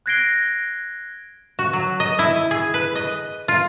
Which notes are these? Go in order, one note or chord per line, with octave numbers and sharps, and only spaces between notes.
F#6 G#6 A#6 C7 D7 G7
F#4
F#3
D#5
E4
G#4
B4
D#5
F4